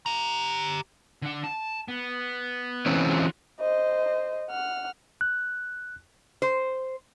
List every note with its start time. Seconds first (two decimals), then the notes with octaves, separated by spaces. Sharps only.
0.06 G4 A#5
1.22 D3 F#5
1.44 A5
1.88 B3
2.86 E3 C4 C#4
3.09 F4 F#4
3.60 C5 D#5
4.50 F#5 F6
5.21 F#6
6.42 C5